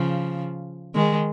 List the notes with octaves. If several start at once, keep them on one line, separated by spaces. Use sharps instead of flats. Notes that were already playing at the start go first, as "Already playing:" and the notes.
Already playing: C#3 F3
D#3 G#3